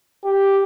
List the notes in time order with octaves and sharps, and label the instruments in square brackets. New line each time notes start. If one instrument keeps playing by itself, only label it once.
[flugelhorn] G4